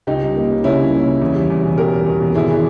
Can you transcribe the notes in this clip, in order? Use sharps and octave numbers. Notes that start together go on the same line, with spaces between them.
C#2 D#4 G4
G3
A#3
C#3
C#2 C#4 E4
G3
A#3
C#3
E2
G3
E2
B2
E2 G4 A#4
G3
E2
B2
G#1 E4 G#4
E3